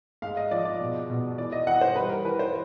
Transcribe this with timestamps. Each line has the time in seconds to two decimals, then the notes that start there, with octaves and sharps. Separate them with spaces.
0.22 G#2 F5
0.37 D#5
0.51 F3 D5
0.65 D5
0.80 B2
1.10 B2
1.38 E3 D5
1.52 D#5
1.67 E3 F#5
1.81 C5
1.96 G3 B4
2.10 A#4
2.25 E3 B4
2.39 C5